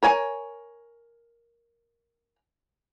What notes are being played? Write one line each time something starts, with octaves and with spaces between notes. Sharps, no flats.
A#4 C#5 G#5